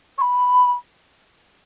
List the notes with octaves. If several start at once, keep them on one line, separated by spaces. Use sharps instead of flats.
C#6
B5